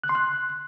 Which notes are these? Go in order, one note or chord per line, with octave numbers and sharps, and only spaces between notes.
F#6
C6
F#6